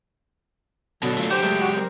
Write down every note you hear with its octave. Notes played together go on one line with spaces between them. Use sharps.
B2 D3 F#3
A3 F4
F#4 G4 C5
F#3 G#3 A3
F#4
C4 A#4